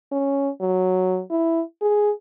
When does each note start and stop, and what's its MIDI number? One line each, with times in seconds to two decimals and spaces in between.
0.12 0.49 61
0.61 1.21 54
1.30 1.62 64
1.82 2.11 68